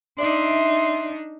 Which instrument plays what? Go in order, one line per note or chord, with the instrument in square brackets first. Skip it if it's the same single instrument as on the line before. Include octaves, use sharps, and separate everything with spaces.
[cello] D4 D#4 [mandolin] D5 E5 [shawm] C6